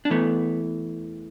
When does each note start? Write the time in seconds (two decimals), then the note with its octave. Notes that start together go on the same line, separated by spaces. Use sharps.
0.05 D4
0.10 E2 E3 A3 B3